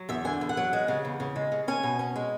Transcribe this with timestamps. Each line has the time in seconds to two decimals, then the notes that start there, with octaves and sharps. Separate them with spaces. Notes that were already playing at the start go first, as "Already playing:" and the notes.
Already playing: F#3
0.09 E2 E5
0.25 D3 G#5
0.41 E2
0.49 F#5
0.57 F#3
0.73 G#3
0.88 C#3
1.05 E2
1.20 C#3
1.36 G#3
1.52 C#3
1.68 C#4 G#5
1.83 B2
1.99 C#4
2.16 G#3